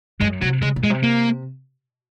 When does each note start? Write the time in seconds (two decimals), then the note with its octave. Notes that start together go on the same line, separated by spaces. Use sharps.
0.21 F#2 G#3
0.42 C3 F#3
0.62 C#3 G#3
0.76 A#2
0.84 G#3
0.90 C3
1.03 A#3